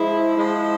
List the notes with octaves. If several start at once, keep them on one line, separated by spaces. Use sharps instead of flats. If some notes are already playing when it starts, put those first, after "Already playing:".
Already playing: F3 G#3 E4
F3 G#3 E4